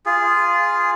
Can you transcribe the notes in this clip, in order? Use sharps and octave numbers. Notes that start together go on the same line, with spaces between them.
F4 G#4